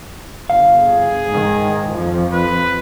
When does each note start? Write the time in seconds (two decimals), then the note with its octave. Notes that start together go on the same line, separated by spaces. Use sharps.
0.50 G1 F5
0.80 G#4
1.28 G#2 D#3
1.93 F2 F3
2.33 B4